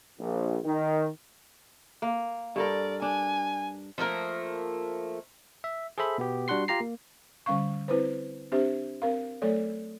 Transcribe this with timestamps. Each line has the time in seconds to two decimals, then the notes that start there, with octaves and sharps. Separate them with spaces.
0.19 A#1
0.63 D#3
2.02 A#3
2.56 G2 A4 A#4 D5
3.02 D4 G#5
3.98 F3 A3 A#3 A#4
5.64 E5
5.98 G#4 A4 C5 E5 B5
6.18 B2 B3 G4
6.48 G3 D4 F#4 F#5 C6 C7
6.68 F4 G4 A#5 C7
6.80 A#3
7.46 D3 G3 C#4 F5 C#6
7.88 C4 E4 B4 C5
8.52 C4 D4 G4 C5 E5
9.02 C4 A#4 F5
9.42 F#3 A3 A4 C#5 D5